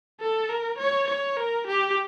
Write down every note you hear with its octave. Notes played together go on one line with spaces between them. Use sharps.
A4
A#4
C#5
C#5
A#4
G4